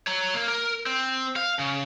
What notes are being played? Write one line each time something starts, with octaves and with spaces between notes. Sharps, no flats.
C#5 A#5
A#3
A#4
C4
F5
C#3